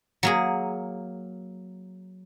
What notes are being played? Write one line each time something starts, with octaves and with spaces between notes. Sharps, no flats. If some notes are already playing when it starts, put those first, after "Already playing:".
F#3 A#3 G#4